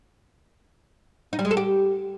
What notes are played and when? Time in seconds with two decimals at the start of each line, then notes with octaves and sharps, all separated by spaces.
1.33 D#4
1.39 G3
1.45 G#3
1.51 A4
1.57 G4